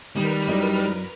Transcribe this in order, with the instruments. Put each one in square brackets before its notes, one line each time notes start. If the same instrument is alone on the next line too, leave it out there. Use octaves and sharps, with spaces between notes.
[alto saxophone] D#3 [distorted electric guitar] G3 [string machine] A#4 B4 F6
[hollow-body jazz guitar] F#2 E4 D5 [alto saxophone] D#4